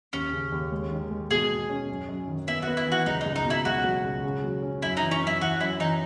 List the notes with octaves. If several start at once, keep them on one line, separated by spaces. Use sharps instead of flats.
D#2 C#4
C#3
D#2
G#3
D#3
G#3
B2 G#4
B2
C#4
F#2
F#2
D#3
B3 E4
B3 F#4
E4
E3 F#4
C#2 D#4
C#2 D#4
D#4
B2
E4
C#2 F#4
F#3
C#2
C#3
F#3
C#4
F#2 E4
D#4
E3
C#4
F#2 E4
E3 F#4
F#2 E4
E3 D#4